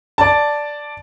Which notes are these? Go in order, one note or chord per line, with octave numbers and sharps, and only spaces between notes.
D5 A5